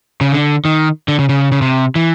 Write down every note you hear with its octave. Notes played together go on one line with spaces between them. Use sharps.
C#3
D3
D#3
D3
C#3
C#3
C#3
C3
E3